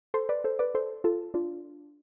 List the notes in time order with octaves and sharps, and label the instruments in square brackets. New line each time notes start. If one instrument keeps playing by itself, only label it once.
[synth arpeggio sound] A4 C5
B4 D5
A4 C5
B4 D5
A4 C5
F4 A4
D4 F4